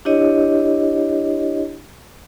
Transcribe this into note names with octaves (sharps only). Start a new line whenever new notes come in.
D4 E4 G4 C#5 D#5